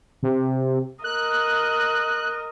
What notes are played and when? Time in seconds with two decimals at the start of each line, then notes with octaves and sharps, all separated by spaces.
0.23 C3
1.04 A#4 D#5 F#6